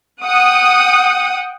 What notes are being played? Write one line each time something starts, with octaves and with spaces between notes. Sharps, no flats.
F#5 G5 D#6